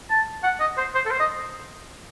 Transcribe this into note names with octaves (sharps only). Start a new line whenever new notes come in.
A5
F#5
D#5
C5
C5
A4
C5
D#5